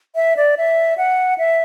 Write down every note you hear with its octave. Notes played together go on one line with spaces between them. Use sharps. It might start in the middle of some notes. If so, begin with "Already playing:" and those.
E5
D5
E5
F#5
E5